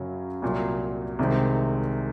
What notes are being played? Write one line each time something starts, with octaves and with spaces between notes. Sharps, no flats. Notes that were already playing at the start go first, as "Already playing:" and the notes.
Already playing: F#2 C#3 F#3 C#4
C2 A#2 F#3
C2 C3 D#3 G#3 C4